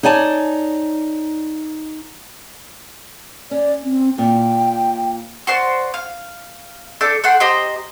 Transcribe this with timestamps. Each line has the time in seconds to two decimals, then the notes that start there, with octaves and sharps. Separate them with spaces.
0.03 D#4 C#5 D5 G#5 A5
3.51 C#4 D5
3.83 C4
4.18 A#2 G5
5.47 F#4 C5 D5
5.94 F5
7.01 D4 A4 D6 G6
7.24 A4 F#5 G5 C6
7.40 G4 C5 D#5 A#5